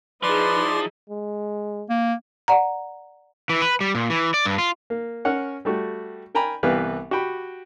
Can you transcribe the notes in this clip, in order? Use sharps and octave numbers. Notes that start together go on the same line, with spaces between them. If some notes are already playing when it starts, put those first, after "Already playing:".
F3 D#4 E4 G#4 B4 D5 C6
G#3
A#3
D5 F#5 A#5
E3
B4
G3
A#2
E3
D5
G2
F4
A#3
C#4 A#4 C#5 F#5
G3 A3 F#4
A#4 G5 G#5 A#5 B5
C2 E3 B3 G4 B4 F5
F#4 G4 G5 B5